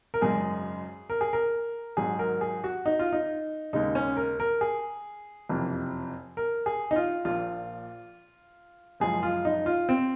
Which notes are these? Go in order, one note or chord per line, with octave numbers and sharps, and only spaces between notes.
A#4
G#1 F#2 C#3 G#3 G#4
A#4
G#4
A#4
G#1 G#2 F#3 G#4
A#4
G#4
F#4
D#4
F4
D#4
D#2 C#3 G#3 D#4
C#4
A#4
A#4
G#4
F#1 F2 C3
A#4
G#4
D#4
F4
A#1 A#2 F3 F4
F#1 F#2 F3 G#3 G#4
F4
D#4
F4
C4